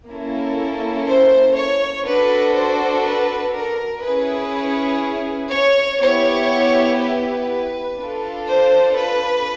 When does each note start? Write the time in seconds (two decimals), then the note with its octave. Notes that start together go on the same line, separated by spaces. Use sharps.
0.10 A#3 C#4 E4 A4
1.08 C5
1.58 C#5
2.07 D4 F#4 A4 B4
2.57 C5
3.06 B4
3.55 A#4
4.04 C#4 E4 G#4 B4
5.51 C#5
6.01 B3 E4 G4 C#5
7.00 B4
7.98 D4 F4 A4
8.48 C5
8.97 B4